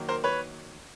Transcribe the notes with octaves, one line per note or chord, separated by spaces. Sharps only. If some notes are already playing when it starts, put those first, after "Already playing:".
Already playing: D#3 F#3 A#3
A#4 C5
B4 C#5